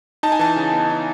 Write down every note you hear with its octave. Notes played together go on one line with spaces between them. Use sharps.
D#4 A5
G#5
E3 A5
C#3
B3
D#4